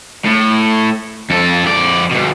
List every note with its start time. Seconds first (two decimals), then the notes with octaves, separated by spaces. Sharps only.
0.25 A2
1.30 F2 A4
1.65 F2 D5
2.11 D2 B2